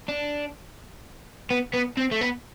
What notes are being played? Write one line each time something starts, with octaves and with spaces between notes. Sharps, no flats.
D4
B3
B3
C4
A3
B3